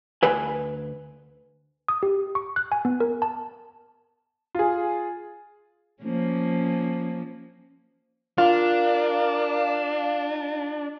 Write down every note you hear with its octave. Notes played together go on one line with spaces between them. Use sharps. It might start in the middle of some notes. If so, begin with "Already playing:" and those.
D2 B4 G#5
D#6
G4
C#6
F#6
G#5
B3
A#4
A5
F4 G#4
F3 A#3 C#4
D4 F4 A#4 F5